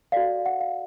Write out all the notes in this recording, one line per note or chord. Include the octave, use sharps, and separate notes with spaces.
F#4 A4 D5 F5
F#5
F5